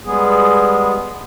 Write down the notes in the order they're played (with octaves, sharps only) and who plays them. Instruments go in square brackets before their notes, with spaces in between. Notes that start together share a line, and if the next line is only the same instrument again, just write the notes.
[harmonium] G3 G#3 B3 G#4